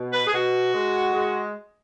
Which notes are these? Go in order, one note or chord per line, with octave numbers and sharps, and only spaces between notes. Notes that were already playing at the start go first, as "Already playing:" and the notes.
Already playing: B2
B4
G#4
B2 F#4
G#3
G#3